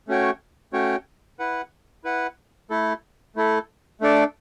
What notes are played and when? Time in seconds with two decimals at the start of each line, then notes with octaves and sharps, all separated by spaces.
0.08 A3 C#4 F#4 C#5 G5
0.73 A3 C#4 F#4 C#5 G5
1.39 E4 B4 F#5
2.04 E4 B4 F#5
2.70 A3 E4 A4
3.36 A3 E4 A4
4.01 A3 D4 A4 D5